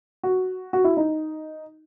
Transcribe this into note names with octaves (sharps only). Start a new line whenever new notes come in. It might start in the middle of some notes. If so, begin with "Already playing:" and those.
F#4
F#4
E4
D#4